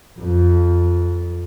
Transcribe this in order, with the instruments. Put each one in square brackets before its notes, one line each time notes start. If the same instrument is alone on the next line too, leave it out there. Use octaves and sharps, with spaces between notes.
[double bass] F2